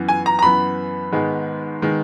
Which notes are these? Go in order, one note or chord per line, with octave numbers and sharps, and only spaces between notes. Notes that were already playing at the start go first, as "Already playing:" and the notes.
Already playing: F#2 E3 B3
G#5
A#5
A#5
F#2 E3 B3 B5
G#2 D#3 G#3 B3
D#3 G#3 B3